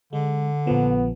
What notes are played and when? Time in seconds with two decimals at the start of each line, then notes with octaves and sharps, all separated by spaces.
0.13 D3 G#3
0.67 A#1 F3 B3